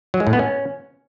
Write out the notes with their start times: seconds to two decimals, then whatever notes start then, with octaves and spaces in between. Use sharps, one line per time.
0.14 F#3
0.20 G#3
0.27 A2
0.33 B3
0.39 C#4